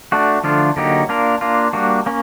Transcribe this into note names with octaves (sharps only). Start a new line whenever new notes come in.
A3 D4 F#4
D3 F3 A3 D4 F4
D3 F#3 A#3 D#4 G4
A#3 D4 F4 A#4
A#3 D4 F4
G3 A#3 D4 F#4
A#3 C#4